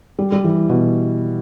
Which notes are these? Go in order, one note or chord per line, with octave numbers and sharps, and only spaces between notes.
G3
G3
E3
B2